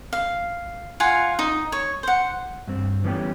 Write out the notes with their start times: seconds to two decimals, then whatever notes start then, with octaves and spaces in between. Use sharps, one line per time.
0.13 F5
1.00 F4 F5 F#5 G#5
1.39 D#4
1.72 C#5
2.03 C5 F#5
2.67 G2 C4
3.04 E3 G3 B3 C#4 D#4 G4